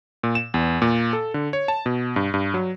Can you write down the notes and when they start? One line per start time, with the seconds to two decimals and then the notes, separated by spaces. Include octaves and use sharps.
0.23 A#2
0.35 E7
0.54 E2
0.82 A#2
1.13 A4
1.34 D3
1.53 C#5
1.68 A5
1.86 B2
2.16 G2
2.34 G2
2.54 F#3